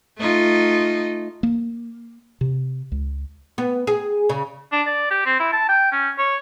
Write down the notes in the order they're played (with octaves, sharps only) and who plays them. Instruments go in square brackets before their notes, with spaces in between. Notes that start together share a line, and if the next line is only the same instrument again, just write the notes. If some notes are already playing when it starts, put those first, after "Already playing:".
[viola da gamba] A3 D#4 F4
[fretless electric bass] A#3
C3
C#2
[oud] B3
G#4
C#3
[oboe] D4
D5
G4
C4
E4
A5
G5
C#4
C#5